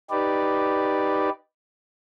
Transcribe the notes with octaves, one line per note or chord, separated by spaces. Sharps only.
D#4 G4 B4 D5